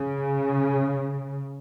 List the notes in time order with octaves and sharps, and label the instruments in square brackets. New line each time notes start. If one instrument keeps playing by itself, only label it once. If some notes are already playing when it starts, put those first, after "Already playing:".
Already playing: [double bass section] C#3